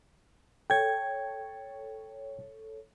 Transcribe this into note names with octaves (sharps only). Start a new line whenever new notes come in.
A4 C#5 G5 G#6